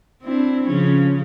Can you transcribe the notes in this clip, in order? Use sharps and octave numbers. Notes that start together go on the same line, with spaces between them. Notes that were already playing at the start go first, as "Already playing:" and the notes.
C4 D4 E4
C#3 F3 C#4